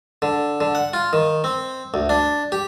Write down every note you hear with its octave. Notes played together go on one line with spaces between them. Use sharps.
D3
D3
F#5
F4
D#3
C4
D2
D4
G4